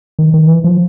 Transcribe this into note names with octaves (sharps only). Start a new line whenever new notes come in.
D#3
D#3
E3
F3